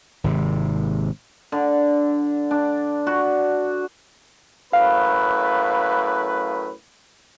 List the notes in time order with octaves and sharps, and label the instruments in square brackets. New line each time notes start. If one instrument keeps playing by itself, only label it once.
[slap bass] G#1 C3
[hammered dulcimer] D3
D4
F#4
[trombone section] F#2 A2 B4 [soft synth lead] F5